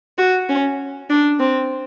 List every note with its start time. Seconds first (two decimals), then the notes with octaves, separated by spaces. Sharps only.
0.18 F#4
0.49 C#4
1.10 D4
1.40 C4